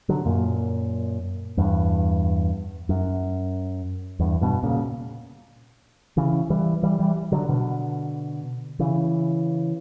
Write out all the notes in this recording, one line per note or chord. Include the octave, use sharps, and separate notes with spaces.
D3 F#3
F#2 A#2
E2 G2
F#2
E2 G2
G2 B2
A#2 C#3
C#3 E3
E3 G3
E3 G3
E3 G3
D3 F#3
B2 D3
C#3 E3